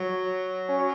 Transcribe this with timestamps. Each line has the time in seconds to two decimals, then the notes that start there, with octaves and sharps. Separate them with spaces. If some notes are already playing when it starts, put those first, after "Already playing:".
Already playing: F#3
0.69 C#4